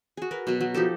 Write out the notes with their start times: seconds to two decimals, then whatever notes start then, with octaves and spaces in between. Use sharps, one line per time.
0.17 F#4 G#4
0.31 A#4 B4
0.47 B2 F#3
0.60 F#3
0.74 F3 D#4 G4 A4